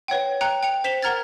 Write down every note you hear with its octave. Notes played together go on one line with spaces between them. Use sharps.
B4 C#5 F#5 G5
G5 A#5 F#6 C#7
G5 C#7 F7
C5 B6 E7 F7 G7
A#4 F#5 A#5 F6 G#6 A6